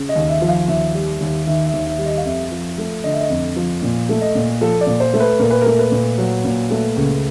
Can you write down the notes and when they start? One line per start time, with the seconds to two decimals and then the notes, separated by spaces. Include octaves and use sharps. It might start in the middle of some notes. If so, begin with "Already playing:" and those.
Already playing: C#3
0.09 D#5
0.15 D#2
0.28 E5
0.41 F3 E5
0.49 F5
0.68 D#2 E5
0.94 G3
1.20 D#2
1.47 D#3 E5
1.66 E5
1.73 D#2
1.86 E5
1.98 G3
2.06 D#5
2.17 F5
2.25 F2 E5
2.51 F3
2.78 A3
3.04 D3 D#5
3.12 E5
3.21 D#5
3.30 F2
3.56 F3
3.82 A#2
4.09 A3
4.21 D#5
4.35 A#2
4.61 F3 A4
4.81 D5
4.87 A#2
5.00 C5
5.13 A3
5.20 B4
5.39 A#2 A#4
5.50 B4
5.61 A3 A#4
5.79 B4
5.92 A#2
6.18 F#3
6.44 A#2
6.70 A3
6.96 C#2